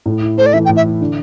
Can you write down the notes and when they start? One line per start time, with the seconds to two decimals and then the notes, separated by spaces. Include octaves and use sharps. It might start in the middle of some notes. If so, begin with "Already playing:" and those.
0.06 A2
0.22 E4
0.38 A3 C5
0.46 D5
0.53 E3 E5
0.65 G5
0.69 A2
0.76 E5
0.85 E4
1.01 D3